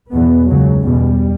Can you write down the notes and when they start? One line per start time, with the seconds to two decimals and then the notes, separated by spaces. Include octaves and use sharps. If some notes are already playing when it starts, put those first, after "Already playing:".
0.12 E2 B2 B3
0.47 C#2 C#3 F#3
0.83 E2 B2 G3